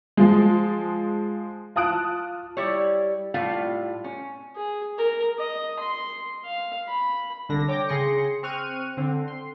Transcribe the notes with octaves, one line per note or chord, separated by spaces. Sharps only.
F3 G#3
F4 A5 D#6 F#6 D7
G3 E4 C#5
A2 G3 F4 F5
C#4
G#4
A#4
D#5
C6
F5
B5
C2 D3 D4 A#6
C#5 G5 D6 A#6
C#3 G#4 C6 A#6 C#7
C4 C#6 F6 F#6 D#7
D3 C4
C6